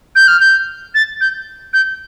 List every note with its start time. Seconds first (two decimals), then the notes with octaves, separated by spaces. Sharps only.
0.16 G6
0.28 F6
0.40 G6
0.95 A6
1.21 G6
1.73 G6